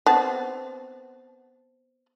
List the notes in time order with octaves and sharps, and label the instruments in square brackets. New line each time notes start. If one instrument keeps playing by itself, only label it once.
[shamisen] B3 C4 A5